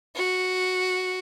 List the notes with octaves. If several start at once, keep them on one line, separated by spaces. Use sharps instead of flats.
F#4